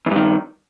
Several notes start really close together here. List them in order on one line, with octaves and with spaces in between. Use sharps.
E2 G2 D#3